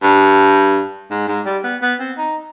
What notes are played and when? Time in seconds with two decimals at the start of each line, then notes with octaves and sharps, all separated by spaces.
0.03 G2
1.10 G#2
1.28 G#2
1.45 G3
1.63 B3
1.81 B3
1.99 C4
2.17 D#4